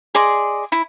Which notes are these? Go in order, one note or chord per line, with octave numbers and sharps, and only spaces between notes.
G#4 D5 D#5 C6
E4